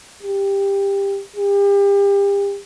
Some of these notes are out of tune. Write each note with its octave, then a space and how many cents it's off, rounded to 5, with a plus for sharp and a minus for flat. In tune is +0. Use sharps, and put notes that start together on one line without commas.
G4 +15
G4 +35